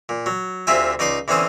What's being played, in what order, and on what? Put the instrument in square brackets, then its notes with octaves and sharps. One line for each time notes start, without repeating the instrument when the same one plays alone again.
[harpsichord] A#2
F#3
D2 C4 F4 G4 E5 G#5
C#2 D#4 D5 C6 D6
E2 D3 C4 C#4 C5 D#6